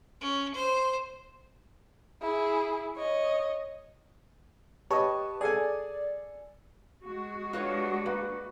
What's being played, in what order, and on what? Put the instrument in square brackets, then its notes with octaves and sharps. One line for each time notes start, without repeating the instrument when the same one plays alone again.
[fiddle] C#4
C5
[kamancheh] E4 G#4
C#5 D#5
[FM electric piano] G4 B4 A5 [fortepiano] C#5 D#5
[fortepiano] G#4 A4 G#5 [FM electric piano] D5
[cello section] G#3 F#4
[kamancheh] B3 D4 [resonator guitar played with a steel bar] F4 B4 C#5
[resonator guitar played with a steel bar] A#3 [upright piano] B4